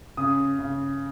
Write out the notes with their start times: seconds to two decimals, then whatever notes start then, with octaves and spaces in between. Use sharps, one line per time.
0.17 C#3 D#6
0.59 C#3